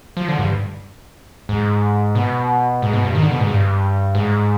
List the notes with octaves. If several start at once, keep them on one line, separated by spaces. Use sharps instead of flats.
F3
D3
G2
G#2
B2
G#2
B2
G2
D#3
D3
B2
G#2
G2
G#2